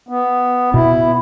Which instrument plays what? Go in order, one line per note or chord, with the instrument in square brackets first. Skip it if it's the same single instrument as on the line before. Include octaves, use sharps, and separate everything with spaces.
[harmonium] B3
[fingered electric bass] B2 [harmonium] E4